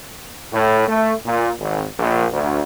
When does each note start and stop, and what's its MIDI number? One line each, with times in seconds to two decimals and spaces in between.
0.53 0.84 45
0.88 1.13 57
1.26 1.51 46
1.60 1.84 32
1.99 2.26 34
2.32 2.62 38